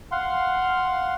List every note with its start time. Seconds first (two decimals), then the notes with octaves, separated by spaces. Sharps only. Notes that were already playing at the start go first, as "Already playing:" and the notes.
0.12 F5 F#5 C6